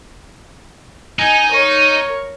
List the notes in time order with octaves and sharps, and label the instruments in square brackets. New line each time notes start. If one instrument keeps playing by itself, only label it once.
[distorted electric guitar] D#4 [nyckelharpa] G#5
[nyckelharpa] A#4 C#5